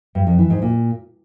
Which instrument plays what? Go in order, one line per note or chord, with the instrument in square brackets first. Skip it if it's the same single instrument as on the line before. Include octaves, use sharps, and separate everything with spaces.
[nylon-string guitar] G2
F2
E3
G#2
A#2